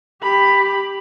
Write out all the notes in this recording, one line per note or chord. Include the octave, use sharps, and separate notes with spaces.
G4 B5